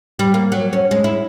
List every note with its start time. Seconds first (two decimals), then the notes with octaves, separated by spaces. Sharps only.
0.19 G3
0.34 A#3
0.52 F#3
0.73 C#4
0.91 G#3
1.04 E4